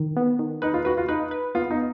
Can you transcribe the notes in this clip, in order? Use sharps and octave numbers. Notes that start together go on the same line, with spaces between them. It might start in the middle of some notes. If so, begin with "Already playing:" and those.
Already playing: D#3
B3
D#3
D#4 B4
F4
F#4 B4
F4
D#4 B4
B4
B3 F4
D#4